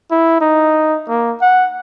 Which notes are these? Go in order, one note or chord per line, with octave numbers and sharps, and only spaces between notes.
E4
D#4
A#3
F#5